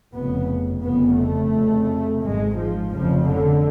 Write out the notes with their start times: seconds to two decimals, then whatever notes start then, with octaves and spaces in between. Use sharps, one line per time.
0.13 F1 F2 C#3 B3
0.83 F1 F2 C#3 B3
1.17 A3
1.52 F1 F2 C#3
2.22 G#1 G#2 G#3
2.57 F3
2.92 F1 F2 C#3 F3
3.27 D3